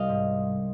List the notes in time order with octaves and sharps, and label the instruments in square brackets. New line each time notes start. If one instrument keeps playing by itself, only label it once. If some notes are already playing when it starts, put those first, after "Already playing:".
Already playing: [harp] C2 G3 D#5 F5
G#2